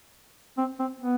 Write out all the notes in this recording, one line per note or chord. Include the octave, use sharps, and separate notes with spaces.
C4
C4
B3